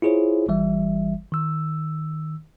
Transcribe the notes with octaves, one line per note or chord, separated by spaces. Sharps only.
E4 F4 G#4 C5 C#5
G1 E3 G3 E5
D#3 E6